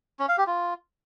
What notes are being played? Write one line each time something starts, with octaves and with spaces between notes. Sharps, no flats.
C#4
F5
G4
F4